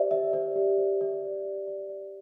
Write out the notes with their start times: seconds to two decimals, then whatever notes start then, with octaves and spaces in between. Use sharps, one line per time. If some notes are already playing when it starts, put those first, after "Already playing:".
Already playing: G4 C5 D5 E5
0.11 C5 E5
0.33 C5 D5
0.56 G4
0.78 C5
1.01 D5
1.23 G4
1.45 G4
1.67 D5
1.89 D5